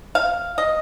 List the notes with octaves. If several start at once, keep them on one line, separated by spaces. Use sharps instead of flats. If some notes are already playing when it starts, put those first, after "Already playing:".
F5
D#5